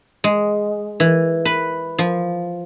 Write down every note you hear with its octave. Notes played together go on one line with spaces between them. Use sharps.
G#3
E3
B4
F3